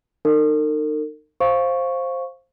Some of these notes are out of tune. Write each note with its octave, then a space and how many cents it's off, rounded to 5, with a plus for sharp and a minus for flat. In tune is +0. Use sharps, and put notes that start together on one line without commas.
D#4 -25 A#4 -45
C5 +10 F5 +0 C#6 +0